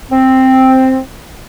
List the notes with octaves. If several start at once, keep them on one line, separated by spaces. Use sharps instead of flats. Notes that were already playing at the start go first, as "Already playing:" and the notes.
C4